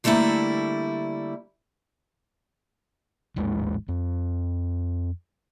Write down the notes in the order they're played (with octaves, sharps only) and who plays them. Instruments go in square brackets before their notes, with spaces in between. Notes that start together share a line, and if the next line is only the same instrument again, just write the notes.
[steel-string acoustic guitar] D3 G3 A3 A#3 E4
[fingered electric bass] A1 D#2 G#2 G#3
F2